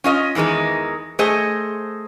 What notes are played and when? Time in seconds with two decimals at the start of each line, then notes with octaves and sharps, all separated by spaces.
0.04 C#4 F4 D#5
0.35 E2 D#3 E3 G#3 D#4
1.19 A3 G#4 C5 D#5